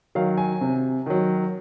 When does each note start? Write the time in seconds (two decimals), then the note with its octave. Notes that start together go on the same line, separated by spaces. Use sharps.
0.15 D#3 F#3 F5
0.37 G#5
0.61 C3
1.06 D#3 F#3